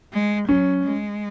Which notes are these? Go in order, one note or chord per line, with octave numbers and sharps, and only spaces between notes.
G#3
F#3 C#4
G#3